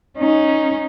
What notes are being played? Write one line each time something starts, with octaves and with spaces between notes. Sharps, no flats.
C#4 D#4